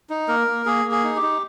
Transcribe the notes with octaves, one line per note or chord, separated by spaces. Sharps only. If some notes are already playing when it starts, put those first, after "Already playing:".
D#4
A#3 A#4
A#3
A#3 G#4
A#3
G#4
D#4
G4
D#4